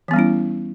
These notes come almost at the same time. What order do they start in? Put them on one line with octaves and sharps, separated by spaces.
E3 B3 G3 C#4 E4